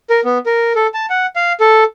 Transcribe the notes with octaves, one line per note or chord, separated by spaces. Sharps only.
A#4
B3
A#4
A4
A5
F#5
F5
A4